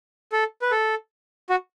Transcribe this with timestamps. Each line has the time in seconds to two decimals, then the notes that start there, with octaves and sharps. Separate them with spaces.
0.32 A4
0.62 B4
0.71 A4
1.50 F#4